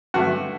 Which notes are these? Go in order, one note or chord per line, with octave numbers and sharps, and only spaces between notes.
G2 D3 A3 F#4